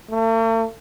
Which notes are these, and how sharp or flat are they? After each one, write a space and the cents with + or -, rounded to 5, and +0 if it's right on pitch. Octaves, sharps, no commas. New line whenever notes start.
A3 +45